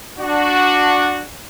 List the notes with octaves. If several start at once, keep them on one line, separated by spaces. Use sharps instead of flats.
D4 F#4